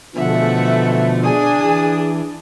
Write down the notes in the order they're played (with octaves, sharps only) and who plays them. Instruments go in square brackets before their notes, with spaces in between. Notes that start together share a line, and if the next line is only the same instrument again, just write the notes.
[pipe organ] B2 D3 F3 [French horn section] E3 G#3 A3 [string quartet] E5 F#5
[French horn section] D4 [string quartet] G#4 G#5 D#6
[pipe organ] E3